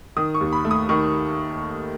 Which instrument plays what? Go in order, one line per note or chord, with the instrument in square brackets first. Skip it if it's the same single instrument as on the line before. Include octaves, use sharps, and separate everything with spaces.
[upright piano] D#3 D#6
C#6
D#2
B5
A3
D#6
D#3 C#6